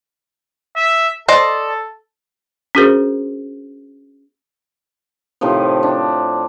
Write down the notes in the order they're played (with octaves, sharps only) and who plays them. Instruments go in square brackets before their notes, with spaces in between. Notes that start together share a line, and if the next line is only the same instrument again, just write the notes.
[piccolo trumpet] E5
[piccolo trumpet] A4 [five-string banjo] C5 D5 D#5
[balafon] C#4 D4 F#4 G#4 A#4 C5
[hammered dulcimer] A2 C3 D#3 F3
D4